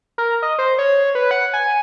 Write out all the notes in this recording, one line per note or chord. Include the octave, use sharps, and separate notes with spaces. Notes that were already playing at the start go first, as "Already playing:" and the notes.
A#4
D#5
C5
C#5
B4
F#5
G#5